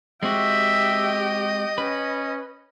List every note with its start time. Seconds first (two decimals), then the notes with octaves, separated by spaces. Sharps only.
0.23 G#3 C4 F#4 G4 D#5 E5 G5
1.78 C#4 B4